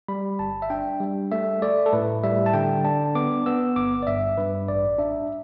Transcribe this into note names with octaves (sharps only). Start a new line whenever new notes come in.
G3 B5
G1 A5
E5
D4 G5
G3
A3 E5
A3 D5
A4
A2 B4
G3 E5
A5
D3 G5
D4 A5
B3 D6
B3 E6
G1 D6
D5
G2 E5
G2 B4
A1 D5
D4 E5